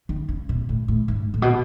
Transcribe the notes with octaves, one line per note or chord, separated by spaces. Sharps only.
D#3
C#3
B2
A2
A2
G#2
A2
B2